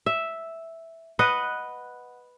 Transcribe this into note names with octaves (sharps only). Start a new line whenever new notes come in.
E5
B4 D#5 F#5